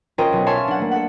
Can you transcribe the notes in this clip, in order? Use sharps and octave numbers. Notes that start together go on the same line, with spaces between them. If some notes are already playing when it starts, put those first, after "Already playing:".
C#4 F4 A#4 C5 D#5 G5
B1
C#5 E5 F5 G#5 A5 C6
D4 F#5
A3 A#3
A4 F#5